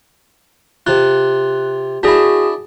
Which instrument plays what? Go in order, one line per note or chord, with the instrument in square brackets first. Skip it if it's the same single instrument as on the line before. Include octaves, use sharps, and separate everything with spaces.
[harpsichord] C3 F4 [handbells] F#6
[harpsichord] D4 E4 [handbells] F#4 G#4